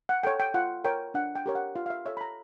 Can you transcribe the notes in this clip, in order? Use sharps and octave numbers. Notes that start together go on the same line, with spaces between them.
F#5
A4 C#5 G5
G5
F4 F#5
A#4 C#5 G5
D4 F#5
G5
G4 A#4 C#5
F#5
F4 F5
F5
E5
A4 C#5 E5
B5
A#5